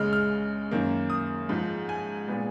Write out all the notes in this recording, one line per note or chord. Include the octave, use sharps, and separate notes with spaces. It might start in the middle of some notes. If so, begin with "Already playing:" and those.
Already playing: C#2 C#3 G#3 F6
F6
F#2 D#3 A#3
D#6
G#2 F3 G#3
G#5
A#2 G#3 B3